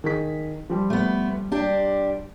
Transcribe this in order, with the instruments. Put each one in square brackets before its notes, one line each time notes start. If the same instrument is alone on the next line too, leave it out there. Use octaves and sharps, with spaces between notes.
[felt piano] D#3 G#4 B6
F3 G3
[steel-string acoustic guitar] A3 B3
D4 G4